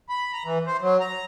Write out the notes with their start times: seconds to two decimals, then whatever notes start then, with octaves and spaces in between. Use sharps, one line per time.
0.09 B5
0.33 A#5
0.45 E3
0.67 C5
0.81 F#3
1.00 A#5